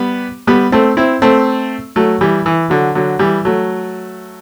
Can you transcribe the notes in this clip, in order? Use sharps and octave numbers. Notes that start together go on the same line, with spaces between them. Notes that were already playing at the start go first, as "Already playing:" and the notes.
Already playing: G3 B3
G3 B3
A3 C4
C4 E4
A3 C4
F#3 A3
E3 G3
E3
D3 F#3
D3 F#3
E3 G3
F#3 A3